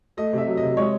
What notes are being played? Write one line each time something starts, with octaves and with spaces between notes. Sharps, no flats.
A3 D#5
C3 E5
F#3
D#5
C3
G#3 C#5